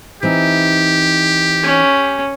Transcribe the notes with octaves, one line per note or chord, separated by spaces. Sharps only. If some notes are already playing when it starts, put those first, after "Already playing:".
E3 C4 D#4 G4
C#4